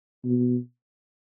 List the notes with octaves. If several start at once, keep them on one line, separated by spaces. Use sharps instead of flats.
B2